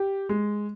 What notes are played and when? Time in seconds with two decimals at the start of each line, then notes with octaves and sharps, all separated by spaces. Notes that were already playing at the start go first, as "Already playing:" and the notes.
Already playing: G4
0.29 G#3